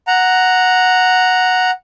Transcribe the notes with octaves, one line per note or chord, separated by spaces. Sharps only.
F#5 A#5